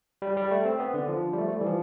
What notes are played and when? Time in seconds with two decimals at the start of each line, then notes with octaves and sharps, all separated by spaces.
0.22 G3
0.37 G3
0.51 A3
0.65 C4
0.80 B3
0.94 D3
1.08 F3
1.33 G3
1.38 A3
1.49 A3
1.52 G3
1.61 E3
1.67 F3